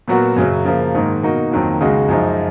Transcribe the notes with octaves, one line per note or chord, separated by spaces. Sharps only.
A#2 F#3 B3 F#4 A#4
F#2 C#3 F#3 C#4
C#3 F3 A#3
G#2 D#3 A#3
B2 A#3 D#4 F#4
F2 D#3 F#3 A#3
C#2 C#3 G#3 D#4 F#4
F#2 F3 G#3 D#4